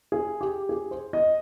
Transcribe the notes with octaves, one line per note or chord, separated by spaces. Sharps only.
G#4
G4
G#4
C5
D#5